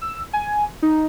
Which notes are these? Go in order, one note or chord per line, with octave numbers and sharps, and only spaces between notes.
E6
G#5
D#4